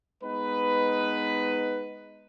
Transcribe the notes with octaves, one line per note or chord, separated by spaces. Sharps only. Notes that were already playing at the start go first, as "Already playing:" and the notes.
G#3 B3 D#4 B4